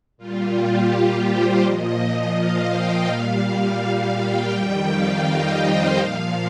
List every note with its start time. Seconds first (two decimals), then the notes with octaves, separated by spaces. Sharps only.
0.17 A#2 G3 F4
0.54 G4
1.27 C5
1.63 A#2 F3 D#5
2.35 F5
2.71 G5
3.07 A#2 G3 F5
3.44 F5
3.80 F5
4.16 G5
4.53 F2 D#3 G3 G5
4.88 F5
5.25 D#5
5.61 C5
5.97 A#2 F3 F5